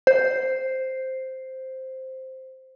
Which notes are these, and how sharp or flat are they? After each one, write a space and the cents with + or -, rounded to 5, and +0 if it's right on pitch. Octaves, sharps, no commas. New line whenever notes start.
C5 +0